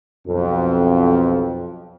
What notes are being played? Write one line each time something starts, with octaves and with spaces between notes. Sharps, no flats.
B1 F2